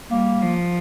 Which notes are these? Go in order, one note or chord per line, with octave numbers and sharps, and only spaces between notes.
G3 A#3
F3